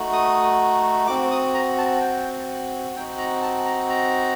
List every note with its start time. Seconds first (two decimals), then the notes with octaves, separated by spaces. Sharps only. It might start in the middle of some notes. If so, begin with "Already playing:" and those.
Already playing: A3 D#4 F#4
0.13 D#6
1.07 C4 F#4 D6
1.31 D#6
1.54 A#5
1.78 A5
2.01 G5
2.96 C4 D#4 F#4 G5
3.18 A#5
3.42 A5
3.65 A#5
3.89 A#5